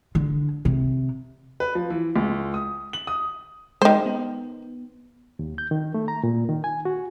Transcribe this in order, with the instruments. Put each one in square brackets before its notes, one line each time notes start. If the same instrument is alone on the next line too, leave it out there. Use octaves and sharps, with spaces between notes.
[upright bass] D3
C3
[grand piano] B4
F3
E3
C#2
D#6
F#7
D#6
[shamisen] D#3 C5 [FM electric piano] G#3
[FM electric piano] B3
[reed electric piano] D#2
G6
D#3
A3
A#5
A#2
D#3
G#5
F#4